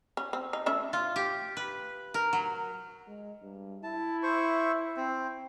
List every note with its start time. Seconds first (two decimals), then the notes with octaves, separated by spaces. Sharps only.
0.17 C#4
0.33 C4
0.53 D#4
0.66 A3 C#4 E5
0.93 F4
1.16 G4
1.57 B4
2.14 A#4
2.33 F#3
3.07 G#3
3.42 G2
3.83 E4 A5
4.23 C5 C#6
4.97 C4